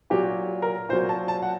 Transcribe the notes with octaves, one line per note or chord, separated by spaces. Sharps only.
A#2 F#3 G4
A#4
A#2 F#3 C5
A5
A5
F#5